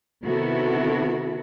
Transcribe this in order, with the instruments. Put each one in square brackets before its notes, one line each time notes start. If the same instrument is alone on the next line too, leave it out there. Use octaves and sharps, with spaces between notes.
[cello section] C3 D#3 B3 E4 F#4 A4